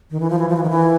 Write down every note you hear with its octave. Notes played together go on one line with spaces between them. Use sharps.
D#3
E3
F3
E3
F3
E3
D#3
E3